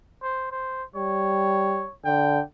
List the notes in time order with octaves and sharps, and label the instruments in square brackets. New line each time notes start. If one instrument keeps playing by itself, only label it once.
[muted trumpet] C5
C5
[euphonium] G3 [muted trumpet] C#5
[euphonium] D3 [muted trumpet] G5